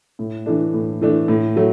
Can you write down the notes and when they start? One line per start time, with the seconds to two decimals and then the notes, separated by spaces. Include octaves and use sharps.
0.19 A2
0.46 E3 A3 D4
0.74 A2
1.01 E3 A3 D4
1.28 A2
1.56 F#3 A3